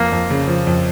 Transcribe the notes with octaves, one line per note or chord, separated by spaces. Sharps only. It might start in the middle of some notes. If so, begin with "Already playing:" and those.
Already playing: F2 A#3
F2
C#3
F3
F2